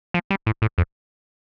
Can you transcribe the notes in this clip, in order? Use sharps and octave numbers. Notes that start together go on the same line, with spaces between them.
F3
G3
A2
A2
F2